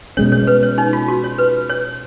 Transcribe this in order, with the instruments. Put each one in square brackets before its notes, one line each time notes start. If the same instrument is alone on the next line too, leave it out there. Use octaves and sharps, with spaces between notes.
[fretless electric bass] B2 G#3 C#4 [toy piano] C#5
[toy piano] C#5
B4
C#5
D#4
F4
F#4
C#5
B4
C#5